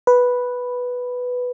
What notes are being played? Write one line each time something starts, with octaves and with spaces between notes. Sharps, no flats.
B4